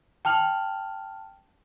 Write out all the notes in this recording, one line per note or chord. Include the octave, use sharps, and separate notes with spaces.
G5 A5 F6 F7 F#7